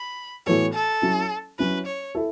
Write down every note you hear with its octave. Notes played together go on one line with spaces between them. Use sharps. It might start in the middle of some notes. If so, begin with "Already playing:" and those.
Already playing: B5
A2 E3 B3 F#4 A4 C#5
A4
F#3 C#4 E4
F#3 C#4 E4 B4
C#5
E4 A4